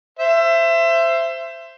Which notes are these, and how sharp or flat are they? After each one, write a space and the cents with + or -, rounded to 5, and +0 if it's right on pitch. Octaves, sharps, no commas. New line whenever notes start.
C5 +0 E5 +25